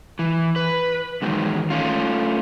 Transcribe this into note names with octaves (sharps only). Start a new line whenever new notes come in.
E3
B4
E2 G#2 D#3 F#3
A3 C#4 F4